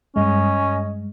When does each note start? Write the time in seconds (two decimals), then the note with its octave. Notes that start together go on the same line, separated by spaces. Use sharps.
0.16 G2 G#3 C#4 D#5